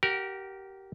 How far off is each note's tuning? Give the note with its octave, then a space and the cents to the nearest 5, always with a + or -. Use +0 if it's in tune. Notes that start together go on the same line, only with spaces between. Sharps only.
G4 -25 A#4 +0 F#5 +0